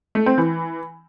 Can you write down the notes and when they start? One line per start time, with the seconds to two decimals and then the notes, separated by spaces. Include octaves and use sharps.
0.15 A3
0.26 C4
0.38 E3